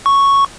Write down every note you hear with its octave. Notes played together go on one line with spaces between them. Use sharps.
C#6